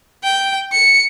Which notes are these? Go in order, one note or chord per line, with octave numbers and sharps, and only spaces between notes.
G5
C#7